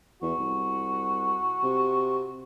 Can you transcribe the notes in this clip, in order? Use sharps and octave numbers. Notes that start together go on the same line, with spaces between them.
E2 F#4
C2
C3